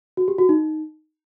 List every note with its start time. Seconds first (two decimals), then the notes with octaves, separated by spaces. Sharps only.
0.17 F#4
0.28 G4
0.38 F#4
0.49 D#4